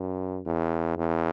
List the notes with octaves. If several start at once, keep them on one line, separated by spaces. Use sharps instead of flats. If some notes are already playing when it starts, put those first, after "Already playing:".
Already playing: F#2
E2
E2